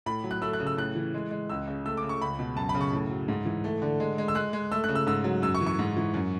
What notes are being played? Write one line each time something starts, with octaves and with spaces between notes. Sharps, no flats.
A2 B5
F#3
F#6
A3 E6
F#6
C#3
E6
A2 F#6
E3
G#3
G#3
C#2 E6
C#3
A3 E6
D6
C#3
C#6
C#2 B5
B2
F#2 A5
B5
C#3
C#6
A2
F#3
G#2
E3
A3
D3
G#3
G#3
E6
G#3 F#6
G#3
A3 E6
C#3 F#6
E6
G#2 E6
F#3
F#2 E6
C#6
E3
C#6
G#2
E3
F#2